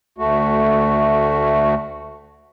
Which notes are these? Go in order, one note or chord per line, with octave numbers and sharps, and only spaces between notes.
D2 A3 F#4